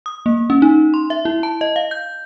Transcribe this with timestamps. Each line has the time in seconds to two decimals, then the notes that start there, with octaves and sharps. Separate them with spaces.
0.06 D#6
0.26 A#3
0.50 C#4
0.62 D#4
0.94 C6
1.10 E5
1.25 E4
1.43 A5
1.61 D#5
1.76 F5
1.91 G6